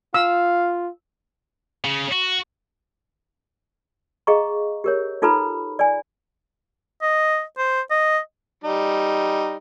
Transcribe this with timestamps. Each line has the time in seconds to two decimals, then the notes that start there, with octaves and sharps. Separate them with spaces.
0.14 F4 F5 E6
1.85 C#3
2.12 F#4
4.27 G#4 D#5 F5 A#5 C#6
4.84 G4 A#4 C#5
5.22 D#4 F4 A4 B4 A#5 B5
5.79 D5 G#5
7.02 D#5
7.58 C5
7.90 D#5
8.64 G3 D#4